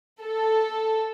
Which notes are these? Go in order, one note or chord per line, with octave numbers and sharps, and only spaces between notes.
A4